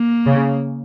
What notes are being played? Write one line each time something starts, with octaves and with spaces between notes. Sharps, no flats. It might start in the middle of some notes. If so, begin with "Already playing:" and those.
Already playing: A#3
C#3